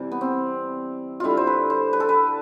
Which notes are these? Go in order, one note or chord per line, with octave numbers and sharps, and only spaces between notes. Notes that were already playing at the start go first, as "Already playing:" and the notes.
Already playing: C3 E3 G3
B3
C4
D3 G3 E4 F4
C5
B4
C5
B4
A4
B4